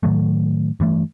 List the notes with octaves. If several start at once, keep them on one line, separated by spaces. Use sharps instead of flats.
A2 D#3 F#3 A3
G2 E3 A3